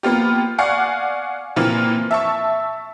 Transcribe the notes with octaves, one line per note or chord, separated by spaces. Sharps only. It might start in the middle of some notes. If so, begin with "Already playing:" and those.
A#3 B3 F4 G4
D5 F5 F#5 G#5 C#6
A#2 E3 A#3 C4 F4
E5 A5 C#6